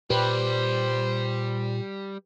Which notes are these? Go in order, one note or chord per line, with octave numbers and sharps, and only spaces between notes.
A#2 G3 G4 B4 C5